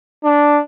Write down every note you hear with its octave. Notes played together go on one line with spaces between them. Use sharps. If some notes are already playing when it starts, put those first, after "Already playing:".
D4